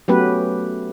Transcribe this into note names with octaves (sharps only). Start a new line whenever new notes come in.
F#3 A3 B3 C#4 G4 B4